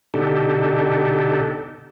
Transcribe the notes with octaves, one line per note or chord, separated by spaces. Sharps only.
B2 D3 D4 D#4 G4 A4